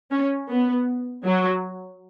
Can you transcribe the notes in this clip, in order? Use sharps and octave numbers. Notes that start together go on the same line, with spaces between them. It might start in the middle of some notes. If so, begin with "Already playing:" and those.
C#4
B3
F#3